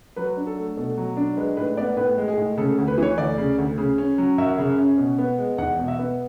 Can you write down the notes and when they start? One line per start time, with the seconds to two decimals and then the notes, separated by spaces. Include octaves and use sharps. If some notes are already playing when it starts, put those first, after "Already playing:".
0.16 F#3 B4
0.37 D4
0.47 A4
0.57 A3
0.77 B2 A4
0.98 F#3
1.17 D4
1.37 G#3 B4
1.57 A2 B4
1.77 B3 D5
1.97 A2 B4
2.18 G#3
2.28 G#4
2.37 A2
2.57 C#3 A4
2.78 D2
2.88 B4
2.98 E3 C#5
3.18 D2 D5
3.38 C#3
3.58 D2
3.78 C#3
3.98 C#4
4.18 F#3
4.38 F#2 E5
4.58 C#3
4.78 C#4
4.98 B2
5.18 B3
5.38 G#3
5.58 E2 F#5
5.79 B2
5.88 E5
5.99 B3